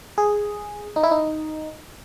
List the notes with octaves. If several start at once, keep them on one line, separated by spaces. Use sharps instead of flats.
G#4
D#4
E4
D#4